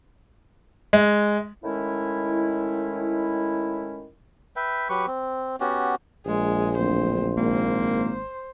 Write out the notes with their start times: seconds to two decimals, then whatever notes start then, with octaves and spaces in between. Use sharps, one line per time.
0.93 G#3
1.63 A2 D#3 G#3 C#4 E4
4.56 B4 E5 G5
4.89 F#3 G4 B4 C#6
5.07 C4
5.60 B3 C#4 F#4 G4
6.26 A#1 G#3
6.77 D1 C5
7.37 G#1 A#3 C5